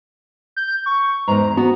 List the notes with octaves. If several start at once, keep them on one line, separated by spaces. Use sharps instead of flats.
G6
C#6
E2 G#2 A#5
B3 F#4